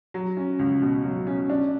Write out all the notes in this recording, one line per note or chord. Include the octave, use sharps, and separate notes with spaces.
F#3
C#4
C#2
B2
F#3
C#4
D4